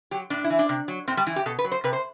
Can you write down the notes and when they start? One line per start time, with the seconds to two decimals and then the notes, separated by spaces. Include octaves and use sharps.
0.11 F#3 G4
0.30 A2 D4
0.44 E4
0.50 E3
0.59 D4
0.69 C3
0.88 F#3
1.08 A2 C4
1.17 G3
1.27 E3 E4
1.36 G4
1.46 B2 A4
1.59 B4
1.64 F#3
1.72 C5
1.84 C3 B4
1.93 C5